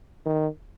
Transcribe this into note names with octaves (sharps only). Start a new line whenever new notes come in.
D#3